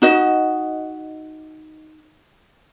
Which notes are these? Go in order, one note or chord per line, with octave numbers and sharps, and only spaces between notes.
D#4 F#4 D#5